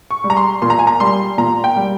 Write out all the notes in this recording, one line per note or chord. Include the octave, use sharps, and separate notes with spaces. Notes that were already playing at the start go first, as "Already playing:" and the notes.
C#6
G3
A#5
C6
A#2 C6
A#5
G#5
A#5
G3 C6
A#2 A#5
G5
G3